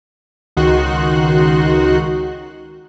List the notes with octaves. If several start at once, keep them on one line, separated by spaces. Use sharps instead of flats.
C#2 D#3 D#4 F#4 C6 F#6